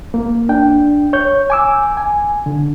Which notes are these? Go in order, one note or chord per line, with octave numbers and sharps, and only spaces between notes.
A#3
D4 G5
C#5 G6
G#5 D6 E6
G#5
D3